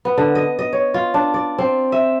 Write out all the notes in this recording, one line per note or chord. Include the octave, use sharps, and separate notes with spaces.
B3
D3
D#5
D#5
C#5
F4
D4
D5
C4
E5